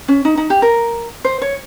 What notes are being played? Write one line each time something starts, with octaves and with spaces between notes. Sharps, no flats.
C#4
D#4
D#4
G4
A#4
C5
C#5